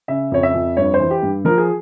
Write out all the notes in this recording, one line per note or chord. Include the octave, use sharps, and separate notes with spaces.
C#3 E5
F2 C#5
E5
F2
G2 C#5
C5
E3
G4
G2
F3 A#4
G#4